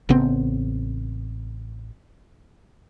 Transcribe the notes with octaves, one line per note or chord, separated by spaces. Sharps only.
A1 C#3 B3 C4